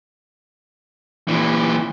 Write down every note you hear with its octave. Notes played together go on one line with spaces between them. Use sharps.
A#2 E3